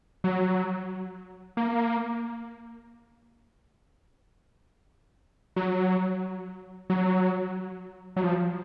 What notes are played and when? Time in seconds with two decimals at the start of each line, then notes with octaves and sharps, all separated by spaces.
0.24 F#3
1.57 A#3
5.56 F#3
6.90 F#3
8.16 F#3
8.24 F3